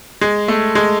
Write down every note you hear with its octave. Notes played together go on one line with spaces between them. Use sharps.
G#3
A3
G#3